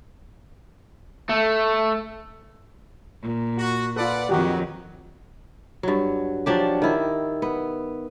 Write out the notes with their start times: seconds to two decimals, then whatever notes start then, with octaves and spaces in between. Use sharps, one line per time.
1.29 A3
3.22 A#2
3.58 F#4
3.96 F4 A4 B4 D5 F#5
4.29 F2 D#3 F#3 F#4 G4
5.83 G2 F#3
6.46 F3 F#3 D4 G4
6.82 D#3 E4
7.42 B3